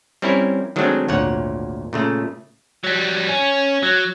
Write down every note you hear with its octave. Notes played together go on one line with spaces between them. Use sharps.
G3 C4 C#4 E4 A#4 C#5
D#3 F#3 G#3 A3 C4 D4
G#1 D2 A#2 C#5 F#5
A#2 C#3 A3
F#3 G3
C#4
F#3